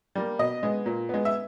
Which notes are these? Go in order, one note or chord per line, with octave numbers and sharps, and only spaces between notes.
G3 A#3
B2 D#5
G#3 B3
A#2
G#3 B3
E5